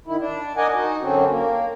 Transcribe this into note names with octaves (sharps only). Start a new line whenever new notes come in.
D#3 E4
D4
A#4 D5 D#5 F#5 G#5
D#4 F#4
F#2 D3 C4 C#4
A#3